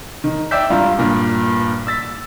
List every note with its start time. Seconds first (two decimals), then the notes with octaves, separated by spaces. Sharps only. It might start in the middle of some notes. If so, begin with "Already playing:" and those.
0.24 D#3
0.51 D5 E5 G5 E6 G6 B6
0.70 G2 G3 F4 A#5
0.99 G2 A#2
1.87 E6 A6 B6